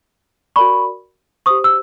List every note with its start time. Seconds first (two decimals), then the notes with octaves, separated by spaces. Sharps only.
0.56 F#4 A#4 D5 B5 C#6
1.46 C5 C#6 D#6
1.50 G4
1.64 E6